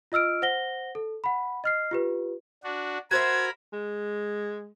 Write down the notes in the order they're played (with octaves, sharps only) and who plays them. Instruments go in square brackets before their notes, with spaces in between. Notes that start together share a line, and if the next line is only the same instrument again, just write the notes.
[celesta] F4 D#5 E6 F6 D7
C5 F#5 A#6 G7
A4
F#5 B5
D#5 F6 C7
F4 G4 B4
[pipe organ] D4 F#4
[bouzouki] F#4 C5 E5 [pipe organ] A#4 B5 [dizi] G#6
[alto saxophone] G#3